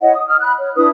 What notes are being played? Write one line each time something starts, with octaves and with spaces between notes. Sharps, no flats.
E4 C#5 D#5 F#5
D#6
D#6 F6
B5 F#6
C#5
D4 E4 B4 D#6